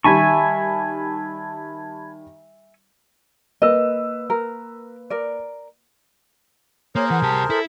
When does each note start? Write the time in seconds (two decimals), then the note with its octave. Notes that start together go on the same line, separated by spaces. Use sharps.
0.04 D#3 G3 E5 G#5 A5 B5 C#6 G#6
3.62 A#3 B4 D#5 E6
4.30 A#4
5.10 A#4 D5
6.95 A#3 G#4 A#4 C5 C#5
7.10 E3 F#5
7.22 C2 G4 A5
7.50 E4 A4